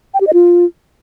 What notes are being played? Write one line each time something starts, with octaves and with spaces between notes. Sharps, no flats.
G5
G4
D#5
F4